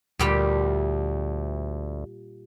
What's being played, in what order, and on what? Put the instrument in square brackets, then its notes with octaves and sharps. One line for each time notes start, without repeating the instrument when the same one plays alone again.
[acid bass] D2 [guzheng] A#2 G3 G4